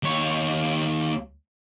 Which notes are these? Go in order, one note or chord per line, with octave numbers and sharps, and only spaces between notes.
D#2 C#5